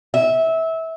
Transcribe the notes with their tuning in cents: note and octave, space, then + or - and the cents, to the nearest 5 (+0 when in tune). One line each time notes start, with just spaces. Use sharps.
E5 -20